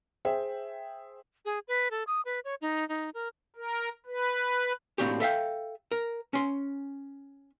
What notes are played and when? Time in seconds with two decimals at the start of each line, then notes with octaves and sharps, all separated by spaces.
0.25 G#4 C5 E5 G5
1.45 G#4
1.68 B4
1.91 A4
2.07 D#6
2.25 B4
2.45 C#5
2.61 D#4
2.89 D#4
3.14 A#4
3.56 A#4
4.06 B4
4.98 A2 A#3 C4 D4 F#4 G4
5.20 A4 E5 F5 G5
5.92 A#4
6.33 C#4 C6